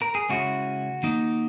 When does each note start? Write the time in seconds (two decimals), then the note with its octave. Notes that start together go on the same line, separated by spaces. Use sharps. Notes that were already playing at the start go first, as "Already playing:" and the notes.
0.02 A#4
0.15 G#4
0.29 C#3 G#3 C#4 E4 F#4
1.03 D#3 A#3 D#4